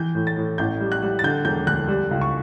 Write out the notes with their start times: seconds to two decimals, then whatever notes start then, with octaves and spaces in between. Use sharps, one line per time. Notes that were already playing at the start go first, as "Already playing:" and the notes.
Already playing: E3 G6
0.15 A2
0.27 A6
0.37 A2
0.58 A1 G6
0.80 G3
0.92 F#6
1.02 G3
1.19 A6
1.24 D3 G6
1.45 E1 G6
1.66 D2 F#6
1.88 G3
2.11 C#2
2.21 C#6